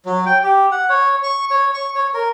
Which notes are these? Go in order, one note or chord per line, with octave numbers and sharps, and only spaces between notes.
F#3
G5
G4
F#5
C#5
C#6
C#5
C#6
C#5
A#4